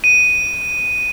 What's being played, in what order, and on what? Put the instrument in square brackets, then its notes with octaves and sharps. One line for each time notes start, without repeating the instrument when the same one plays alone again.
[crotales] D#7